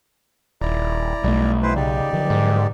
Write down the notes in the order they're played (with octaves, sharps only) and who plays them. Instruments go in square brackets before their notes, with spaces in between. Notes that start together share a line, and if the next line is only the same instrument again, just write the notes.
[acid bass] D#1 [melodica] E4 D5 A#5
[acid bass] B1 [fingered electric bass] G3 A3
[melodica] E4 B4 C5
[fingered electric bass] C#3 [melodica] D#4 G4 D5
[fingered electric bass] D3 F3 F#3
[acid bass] G#2